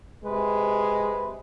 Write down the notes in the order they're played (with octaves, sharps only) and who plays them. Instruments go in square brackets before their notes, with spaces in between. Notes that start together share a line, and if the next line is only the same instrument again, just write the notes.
[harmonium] C3 B4 [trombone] G#3